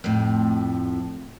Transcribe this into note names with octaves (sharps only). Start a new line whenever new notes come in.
F2 A2